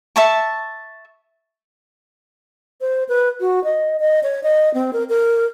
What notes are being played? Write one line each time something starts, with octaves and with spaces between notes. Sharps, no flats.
E5 A5 C#6
C5
B4
F#4
D#5
D#5
C#5
D#5
C4
A#4
A#4